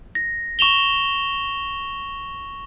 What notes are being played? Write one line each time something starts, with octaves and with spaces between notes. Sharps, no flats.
A#6
C#6 E7 F7 G7